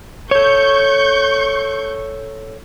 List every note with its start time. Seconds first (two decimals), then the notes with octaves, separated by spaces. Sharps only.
0.31 A4 C#5 C#6 G6